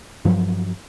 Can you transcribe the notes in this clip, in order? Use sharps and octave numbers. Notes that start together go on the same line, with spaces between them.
G2 F3 F#3